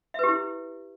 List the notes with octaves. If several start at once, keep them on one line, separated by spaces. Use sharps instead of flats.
E4 G4 B4 E5